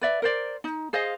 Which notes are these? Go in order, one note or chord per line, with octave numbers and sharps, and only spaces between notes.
B4 D5 E5
A#4 C5 D5
D#4
G#4 C5 D#5 F5